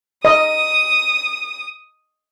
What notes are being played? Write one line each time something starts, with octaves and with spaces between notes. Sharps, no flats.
D#5 D#6